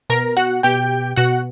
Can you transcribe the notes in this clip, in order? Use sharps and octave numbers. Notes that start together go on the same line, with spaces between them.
B2 A#4 A#5
F#4 F#5
B2 G4 G5
B2 F#4 F#5